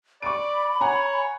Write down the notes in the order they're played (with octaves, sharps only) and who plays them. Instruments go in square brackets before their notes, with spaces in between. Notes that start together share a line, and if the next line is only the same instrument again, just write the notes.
[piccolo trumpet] D5 [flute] B5 [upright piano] C#6 D6 D7
[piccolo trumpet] C#5 [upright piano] F#5 G#5 A#5